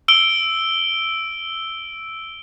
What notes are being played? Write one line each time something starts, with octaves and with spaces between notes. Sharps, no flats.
E6 D7 G7